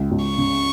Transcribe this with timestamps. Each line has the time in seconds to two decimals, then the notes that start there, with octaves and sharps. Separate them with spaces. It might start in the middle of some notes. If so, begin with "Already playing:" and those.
Already playing: C#2
0.11 C#2
0.25 C#6
0.38 C#3